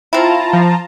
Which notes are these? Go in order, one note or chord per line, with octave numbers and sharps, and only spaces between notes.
C4 E4 F4 A5 A#5
F3